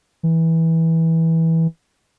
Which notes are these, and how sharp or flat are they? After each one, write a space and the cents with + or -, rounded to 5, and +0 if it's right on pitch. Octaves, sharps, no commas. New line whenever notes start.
E3 -15